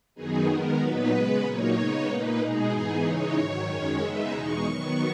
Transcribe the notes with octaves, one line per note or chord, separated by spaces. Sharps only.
F#2 D#3 F#3 B3 D#4 G#4
D#3 G#3 B3 A#4
A#2 F#3 B3 D#4 B4
C#3 G#3 B3
A#2 F#3 A#3 D#4 C#5
C#3 G#3 B3 D#4
A#2 A#3 D#4 B4
B2 G#3 D#4 G#4
G#2 E3 B3 D#4
C#3 E3 G#3 D#4 C#5
G#2 D#3 F#3
F#2 D#3 G#3 C#4
C#3 G#3 B3 D#4 E5
E2 B2 G#3 D#4 C#6
D#3 F#3 B3 C#6